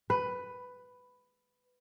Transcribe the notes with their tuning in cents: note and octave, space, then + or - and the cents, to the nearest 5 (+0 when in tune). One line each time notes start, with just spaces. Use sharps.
B4 +10